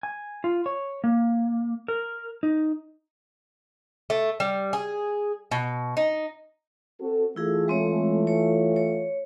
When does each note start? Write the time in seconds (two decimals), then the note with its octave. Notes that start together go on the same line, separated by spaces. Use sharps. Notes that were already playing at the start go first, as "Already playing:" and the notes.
0.03 G#5
0.44 F4
0.66 C#5
1.04 A#3
1.88 A#4
2.43 D#4
4.10 A3
4.40 G3
4.73 G#4
5.51 B2
5.97 D#4
7.00 C4 F#4 A4
7.36 E3 A3 E4 F4 G#4
7.68 G#3 C4 C#5
8.27 C#5
8.76 C#5